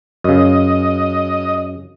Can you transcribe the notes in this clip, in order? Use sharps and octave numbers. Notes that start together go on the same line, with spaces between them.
F#2 C#3 D#5